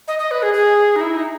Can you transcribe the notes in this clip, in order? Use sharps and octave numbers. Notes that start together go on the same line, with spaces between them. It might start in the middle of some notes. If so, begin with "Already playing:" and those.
D#5
D#5
B4
G#4
G#4
D#4
E4
D#4